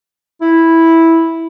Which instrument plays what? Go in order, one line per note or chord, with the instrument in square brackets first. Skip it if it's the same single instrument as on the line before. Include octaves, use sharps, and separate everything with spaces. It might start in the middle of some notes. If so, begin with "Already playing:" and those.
[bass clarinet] E4